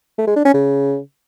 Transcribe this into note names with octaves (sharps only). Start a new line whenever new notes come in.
A3
G#3
D4
C#4
C#3